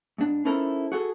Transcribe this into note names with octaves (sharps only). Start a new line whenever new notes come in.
G#2 D4
C#4 D#4 E4 A4 A#4 C5
F#4 G#4 A4